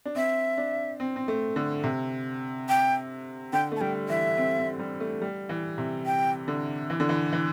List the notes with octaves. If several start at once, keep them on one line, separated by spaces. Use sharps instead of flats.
D4
C4 E5
D4
C4
C4
A3
D3
C3
G5
D3 G5
A3
A5
G3 G5
E3 E5
C4
C4
G3
A3
G3
E3
C3
G5
D3
E3
D3
E3
E3